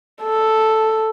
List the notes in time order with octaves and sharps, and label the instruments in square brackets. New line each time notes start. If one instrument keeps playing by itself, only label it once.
[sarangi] A4